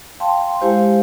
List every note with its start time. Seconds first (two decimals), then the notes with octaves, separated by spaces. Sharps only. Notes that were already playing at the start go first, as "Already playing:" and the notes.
0.20 F5 G5 A5 C6
0.61 G#3 E4 G4 C5 F5